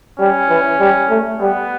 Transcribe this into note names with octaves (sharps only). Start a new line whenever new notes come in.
G3 C#4
E3
G3
A3
G3 B3